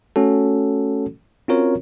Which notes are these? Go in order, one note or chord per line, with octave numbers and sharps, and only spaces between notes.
A3 C#4 F#4 A4
C4 C#4 F4 F#4 A#4 C#5